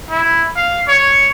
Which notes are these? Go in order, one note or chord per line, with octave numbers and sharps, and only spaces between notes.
E4
F5
C#5